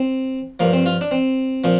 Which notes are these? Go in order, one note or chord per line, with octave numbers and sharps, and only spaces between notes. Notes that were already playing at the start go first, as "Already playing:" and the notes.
Already playing: C4
G2 F3 A#3
C4
F4
D4
C4
A#2 F3